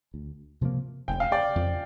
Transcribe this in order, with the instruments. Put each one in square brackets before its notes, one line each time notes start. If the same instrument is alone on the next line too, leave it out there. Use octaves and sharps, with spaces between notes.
[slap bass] D2
C3 F3 A#3
[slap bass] F1 [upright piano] G5
[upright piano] F5
D5 G5
[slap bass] F2 F3